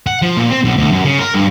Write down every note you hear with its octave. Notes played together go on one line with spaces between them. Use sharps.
F#5
F3
A#2
C4
B1
D2
F#2
C#3
A#4
G2